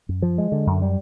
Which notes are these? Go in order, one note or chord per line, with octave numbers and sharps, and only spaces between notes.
F#2
F3
G#3
D3
F#2
G3